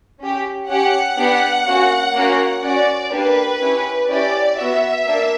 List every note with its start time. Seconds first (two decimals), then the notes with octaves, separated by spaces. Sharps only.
0.20 C#4 G4
0.68 C#4 G4 F#5
1.17 B3 D4 G4
1.65 A#3 C#4 F#4
2.14 A#3 C#4 F#4
2.62 C#4 F#4 D5
3.11 A#3 D4 G4 B4
3.60 C#4 E4 G4
4.08 C#4 E4 G4 D5
4.57 B3 F#4 E5
5.06 A#3 D4